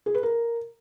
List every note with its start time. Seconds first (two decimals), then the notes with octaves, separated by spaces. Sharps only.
0.06 G#4
0.15 B4
0.23 A#4